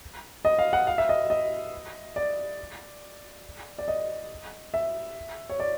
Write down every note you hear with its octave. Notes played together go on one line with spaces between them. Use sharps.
D#5
F5
F#5
F5
E5
D#5
D#5
D5
D5
D#5
E5
C#5
D5